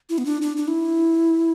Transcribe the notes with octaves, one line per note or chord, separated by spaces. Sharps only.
E4
B3
D4
D4
D4
E4